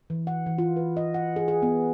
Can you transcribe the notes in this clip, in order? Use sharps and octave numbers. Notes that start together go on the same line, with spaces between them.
E3
F#5
E3
F4
B4
D#5
F#5
G#4
G#4
B3